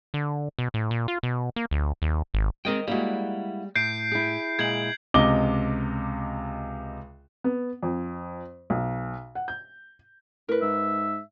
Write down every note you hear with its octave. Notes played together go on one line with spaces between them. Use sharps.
D3
B2
A2
A#2
F4
B2
A#3
D2
D#2
G#1
G#3 C4 A#4 D#5 G5
G3 G#3 A#3 E4 F#4
A2 G6 C7 D7
E4 G#4
A#2 G#3 G#6 F#7
C#2 C3 D#5 D6 G7
B3
F2
B1
F#5
G6
A2 A#4 B4
G#2 E5